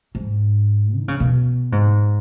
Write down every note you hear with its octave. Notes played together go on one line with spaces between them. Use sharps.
G#2
D#3
C#3
B2
G#2